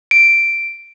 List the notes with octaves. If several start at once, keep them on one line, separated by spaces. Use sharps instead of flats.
D7